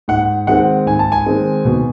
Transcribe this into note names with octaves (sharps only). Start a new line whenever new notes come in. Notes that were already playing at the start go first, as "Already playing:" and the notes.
G#2 F#5
D#3 G#3 C4 F#5
G#2 G#5
A5
G#5
D#3 G#3 C4
B2